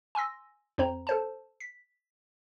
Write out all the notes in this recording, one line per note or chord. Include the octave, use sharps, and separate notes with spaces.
G#5 C6 E6 A#6
F2 C4 C5 A#5
A4 C5 A5
B6